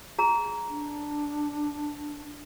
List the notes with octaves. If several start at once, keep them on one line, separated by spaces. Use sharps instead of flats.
G#4 A#5
D4